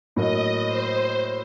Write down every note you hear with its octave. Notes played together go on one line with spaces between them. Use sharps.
A2 F#3 A#3 D#5
C5